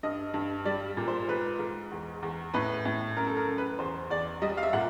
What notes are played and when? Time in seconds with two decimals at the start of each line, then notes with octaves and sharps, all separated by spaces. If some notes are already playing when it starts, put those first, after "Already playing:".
0.03 G2 D#5
0.34 G2
0.65 G3 D5
0.97 A#2
1.08 C5
1.28 G#2 B4
1.59 G#2
1.91 E2
2.22 E2
2.54 A2 B4
2.85 A2
3.17 F#2 A#4
3.27 A4
3.37 A#4
3.48 F#2
3.58 B4
3.79 E2 C5
4.10 E2 D5
4.42 G3 D#5
4.57 F5
4.63 E5
4.73 A#2 F#5